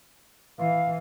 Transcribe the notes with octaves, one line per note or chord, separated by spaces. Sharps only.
E3 F5